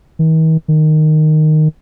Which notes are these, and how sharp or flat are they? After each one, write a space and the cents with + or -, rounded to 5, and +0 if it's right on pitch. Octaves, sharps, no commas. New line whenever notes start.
D#3 +45
D#3 -10